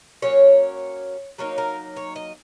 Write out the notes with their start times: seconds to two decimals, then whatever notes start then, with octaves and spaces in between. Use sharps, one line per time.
0.22 F#3 A#3 C#4 C#5
1.38 F#3 A#3 D#4 C#5
1.58 A#4
1.96 C#5
2.16 D#5